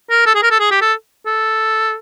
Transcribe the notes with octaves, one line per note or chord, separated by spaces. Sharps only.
A#4
A4
G#4
A#4
A4
G#4
G4
A4
A4